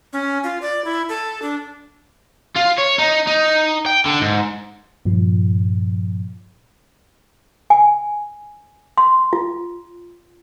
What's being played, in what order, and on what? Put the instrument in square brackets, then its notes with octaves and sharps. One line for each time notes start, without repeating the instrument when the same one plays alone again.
[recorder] C#4
F4
D5
E4
A4
D4
[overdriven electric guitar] F4
C#5
D#4
D#4
G5
D3
G#2
[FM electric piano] G2 A#2 F3
[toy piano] G#5
C6
F4